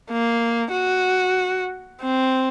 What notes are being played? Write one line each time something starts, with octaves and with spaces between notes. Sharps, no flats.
A#3
F#4
C4